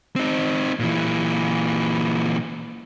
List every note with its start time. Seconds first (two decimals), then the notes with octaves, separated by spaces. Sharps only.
0.16 C4 D#4
0.80 A#2 E3